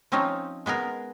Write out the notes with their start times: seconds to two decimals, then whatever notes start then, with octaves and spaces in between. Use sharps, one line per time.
0.12 F3 C4 C#4 D#4 F4
0.66 G#3 B3 G#4 A#4